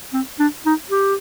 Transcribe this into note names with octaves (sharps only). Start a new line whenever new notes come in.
C4
D4
D#4
G4